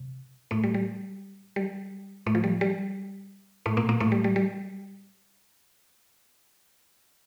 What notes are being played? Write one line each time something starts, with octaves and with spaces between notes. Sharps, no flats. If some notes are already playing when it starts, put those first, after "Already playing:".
Already playing: C3
A2 A3
G3
G3
G3
A2 A3
F3
G3
G3
A2 A3
A#2 A#3
A#2 A#3
A2 A3
G3
G3
G3